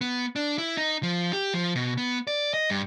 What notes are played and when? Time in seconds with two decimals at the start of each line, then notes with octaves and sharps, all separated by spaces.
0.01 B3
0.36 D4
0.58 E4
0.77 D#4
1.03 F3
1.33 G4
1.54 F3
1.76 B2
1.98 B3
2.27 D5
2.54 D#5
2.70 G2